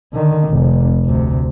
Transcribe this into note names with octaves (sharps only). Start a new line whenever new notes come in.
D3 D#3
F1 C3
D2 C3